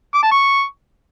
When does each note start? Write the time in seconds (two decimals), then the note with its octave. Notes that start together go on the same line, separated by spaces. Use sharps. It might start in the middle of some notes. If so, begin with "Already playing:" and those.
0.14 D6
0.23 A5
0.31 C#6